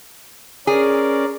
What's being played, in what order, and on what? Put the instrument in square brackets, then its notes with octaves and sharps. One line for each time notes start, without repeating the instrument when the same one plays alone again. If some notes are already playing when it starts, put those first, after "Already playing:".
[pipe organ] C#4 A#4 D5 [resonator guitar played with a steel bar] G#4